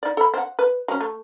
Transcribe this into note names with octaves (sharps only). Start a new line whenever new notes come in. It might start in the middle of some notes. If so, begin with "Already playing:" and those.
D#4 D5
A4 B5
C4 F#5
B4
F#3 C#4
A3